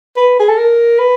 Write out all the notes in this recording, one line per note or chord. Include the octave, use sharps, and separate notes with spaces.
B4
G#4
A4
A#4
B4